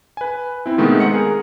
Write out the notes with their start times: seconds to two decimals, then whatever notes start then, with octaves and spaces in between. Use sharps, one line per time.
0.17 B4 G#5
0.66 C4 E4
0.78 B2 D#3 G#3 A3 B3 C4
1.00 C5 F#5 C#7
1.13 G#4 A#4